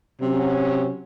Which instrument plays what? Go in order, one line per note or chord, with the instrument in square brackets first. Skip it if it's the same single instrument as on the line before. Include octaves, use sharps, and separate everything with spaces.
[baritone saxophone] C3 [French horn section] F#3 C#4